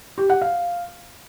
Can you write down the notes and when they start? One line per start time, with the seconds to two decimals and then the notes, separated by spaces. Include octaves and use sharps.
0.18 G4
0.30 F#5
0.42 F5